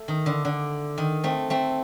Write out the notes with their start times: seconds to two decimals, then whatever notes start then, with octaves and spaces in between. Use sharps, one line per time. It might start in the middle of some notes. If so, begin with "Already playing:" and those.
Already playing: A3
0.08 D#3
0.26 D3
0.45 D3
0.98 D#3
1.24 A3 C4
1.50 A3 C4